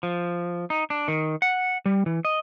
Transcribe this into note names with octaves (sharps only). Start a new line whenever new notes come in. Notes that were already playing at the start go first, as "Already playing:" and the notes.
F3
D#4
D4
D#3
F#5
G3
E3
D#5